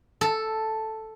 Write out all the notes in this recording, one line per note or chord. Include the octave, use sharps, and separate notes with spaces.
A4